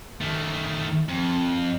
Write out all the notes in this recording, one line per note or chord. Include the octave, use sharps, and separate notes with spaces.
D#3 A3
F2